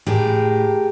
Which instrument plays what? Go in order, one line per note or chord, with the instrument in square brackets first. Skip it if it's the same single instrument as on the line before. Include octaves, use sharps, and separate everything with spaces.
[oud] A2 [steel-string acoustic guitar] G4 G#4 A#4